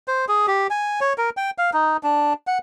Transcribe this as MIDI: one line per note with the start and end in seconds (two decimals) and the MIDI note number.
0.08 0.25 72
0.28 0.46 68
0.47 0.67 67
0.70 1.00 80
1.01 1.13 73
1.18 1.30 70
1.37 1.50 79
1.58 1.70 77
1.73 1.97 63
2.03 2.33 62
2.47 2.58 78